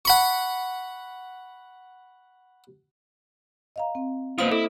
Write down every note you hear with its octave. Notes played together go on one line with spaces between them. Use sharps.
F#5 B5 C#6
D#5 F5 A#5
C4
A#3 B3 F4 C5 D#6
E4 A4